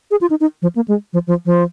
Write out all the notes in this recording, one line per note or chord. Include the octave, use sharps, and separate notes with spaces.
G#4
F4
D#4
D#4
F3
A#3
G#3
F3
F3
F3